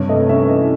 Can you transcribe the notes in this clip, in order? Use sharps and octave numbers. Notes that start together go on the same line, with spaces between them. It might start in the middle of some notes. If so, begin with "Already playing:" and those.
Already playing: G2 C3 C#5
A3 D#5
C#4 E5
E3 D#5